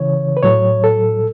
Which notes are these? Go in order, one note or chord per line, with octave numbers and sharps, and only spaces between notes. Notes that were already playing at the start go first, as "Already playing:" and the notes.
Already playing: C#3 E3 C#5
B4
A2 F#3 C#5
A4